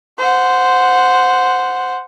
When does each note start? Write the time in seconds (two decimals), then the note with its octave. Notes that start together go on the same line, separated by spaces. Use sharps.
0.18 C5 F#5